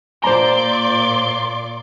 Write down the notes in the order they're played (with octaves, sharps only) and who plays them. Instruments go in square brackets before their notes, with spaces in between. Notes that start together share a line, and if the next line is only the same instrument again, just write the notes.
[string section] A#2 D5 D6 [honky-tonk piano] C5 A#5 [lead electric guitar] C6